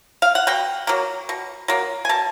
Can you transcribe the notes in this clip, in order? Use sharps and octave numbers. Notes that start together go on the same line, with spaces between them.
F5
F#5
B2 G5
F#3 A#3
B2
F#3 A#3
G#5
B2 A5